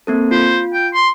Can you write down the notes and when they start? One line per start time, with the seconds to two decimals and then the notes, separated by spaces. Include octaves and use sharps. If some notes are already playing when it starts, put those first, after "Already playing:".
0.07 A#3 C4 A4
0.31 F4 C5
0.73 G5
0.94 C6